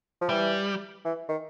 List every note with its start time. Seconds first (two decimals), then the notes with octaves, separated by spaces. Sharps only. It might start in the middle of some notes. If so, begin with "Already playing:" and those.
0.21 F3
0.29 E3 G3
1.05 E3
1.29 D#3